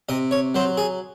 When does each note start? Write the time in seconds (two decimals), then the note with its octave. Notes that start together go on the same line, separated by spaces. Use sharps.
0.09 C3 D#5
0.31 C#5
0.55 F#3 C5
0.78 G#4